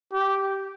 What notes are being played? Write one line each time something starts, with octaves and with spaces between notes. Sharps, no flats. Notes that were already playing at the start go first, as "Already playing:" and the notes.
G4